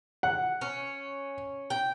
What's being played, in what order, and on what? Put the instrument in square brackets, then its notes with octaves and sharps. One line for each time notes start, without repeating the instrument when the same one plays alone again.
[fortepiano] F#5
[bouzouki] C#4
G5